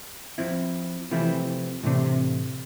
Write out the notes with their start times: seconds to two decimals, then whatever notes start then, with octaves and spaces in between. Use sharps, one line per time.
0.38 F3 C4 E4
1.10 C3 E3 F3 A3 C4
1.83 A2 C3 E3 A3 D4